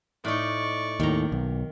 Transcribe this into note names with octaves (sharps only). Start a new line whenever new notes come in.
A2 D#4 D5 C#6
D#2 A2 D#3 A#5
B1